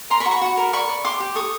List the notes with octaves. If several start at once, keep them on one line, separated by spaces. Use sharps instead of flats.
A#4 A#5 C6
B5 C#6
F#4
B5 C#6
F#4
A#4
D5 B5 C#6
D5
G4 C6 D6
G4
A4 C#6 D#6